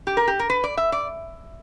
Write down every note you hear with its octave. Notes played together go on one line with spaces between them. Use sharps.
G4
A#4
G4
A#4
B4
D5
E5
D5